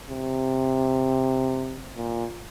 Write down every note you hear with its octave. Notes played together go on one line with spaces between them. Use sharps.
C3
A#2